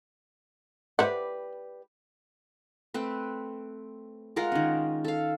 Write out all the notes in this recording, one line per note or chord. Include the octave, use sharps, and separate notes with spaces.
G4 B4 C5 D5 E5 F#5
A3 C4 B4
G#3 F4 A#4 F#5
D#3 C#4
A4 F5